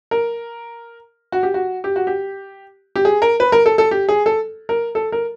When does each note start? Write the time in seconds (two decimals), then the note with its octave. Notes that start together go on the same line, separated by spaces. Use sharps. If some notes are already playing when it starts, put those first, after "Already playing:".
0.11 A#4
1.32 F#4
1.43 G4
1.54 F#4
1.84 G4
1.96 F#4
2.07 G4
2.96 G4
3.05 G#4
3.22 A#4
3.40 B4
3.52 A#4
3.66 A4
3.78 A4
3.91 G4
4.09 G#4
4.26 A4
4.69 A#4
4.95 A4
5.12 A#4